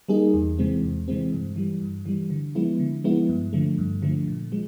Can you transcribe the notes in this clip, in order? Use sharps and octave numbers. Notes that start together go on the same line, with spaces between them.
G3 A#3 D#4 G#4
E2
C3 E3 G#3 C4
E2
C3 E3 G#3 C4
G2
E3 G3
G2
E3 G3
D3
F3 G#3 B3 E4
D3
F3 G#3 B3 E4
G2
D3 F3 A3
G2
D3 F3 A3
A#2
F3 G#3